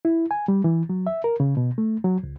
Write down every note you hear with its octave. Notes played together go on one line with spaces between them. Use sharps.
E4
G#5
G3
E3
F#3
E5
A#4
C#3
B2
A3
F#3
C#2